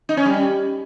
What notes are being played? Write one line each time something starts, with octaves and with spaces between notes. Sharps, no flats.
D#4
C#4
G3